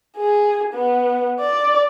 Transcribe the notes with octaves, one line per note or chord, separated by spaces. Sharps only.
G#4
B3
D5